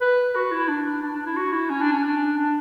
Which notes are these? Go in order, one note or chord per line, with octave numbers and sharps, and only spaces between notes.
B4
F#4
E4
D4
D4
D4
E4
F#4
E4
C#4
D4
C#4
D4
D4